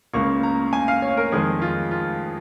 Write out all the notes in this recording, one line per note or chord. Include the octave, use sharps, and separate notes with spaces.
C#2 C#3 A#3 C#6
A#5
G#5
F5
C#5
A#4
F2 D#3 G#3 G#4
F4
F4